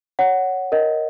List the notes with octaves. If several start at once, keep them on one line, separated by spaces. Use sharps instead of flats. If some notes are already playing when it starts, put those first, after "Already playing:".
C#5 F#5
A#4 D#5